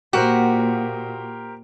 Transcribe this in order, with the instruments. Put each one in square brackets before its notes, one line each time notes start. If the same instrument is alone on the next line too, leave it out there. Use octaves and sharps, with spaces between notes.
[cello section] A#2 [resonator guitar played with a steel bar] F#4 [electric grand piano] G4 A#4 C5